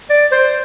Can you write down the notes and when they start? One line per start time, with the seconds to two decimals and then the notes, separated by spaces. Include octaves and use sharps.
0.10 D5
0.32 C5